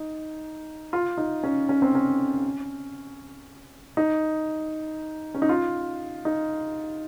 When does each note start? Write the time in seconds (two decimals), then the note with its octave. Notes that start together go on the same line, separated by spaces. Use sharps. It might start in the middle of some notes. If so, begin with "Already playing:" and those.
Already playing: D#4
0.93 F4
1.18 D#4
1.43 C#4
1.69 C#4
1.82 C4
1.95 C#4
3.97 D#4
5.34 C#4
5.42 D#4
5.49 F4
6.25 D#4